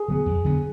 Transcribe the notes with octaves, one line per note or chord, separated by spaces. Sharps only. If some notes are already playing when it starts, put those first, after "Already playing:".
Already playing: G#4
D3 F#3 B3
F2
D3 F#3 B3